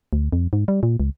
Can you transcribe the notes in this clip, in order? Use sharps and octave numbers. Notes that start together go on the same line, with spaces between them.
D2
F2
G#2
G3
A#2
C#2